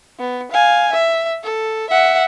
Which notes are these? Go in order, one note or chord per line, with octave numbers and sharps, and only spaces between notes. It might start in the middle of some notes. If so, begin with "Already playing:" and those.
B3
F5 G#5
E5
A4
E5 F#5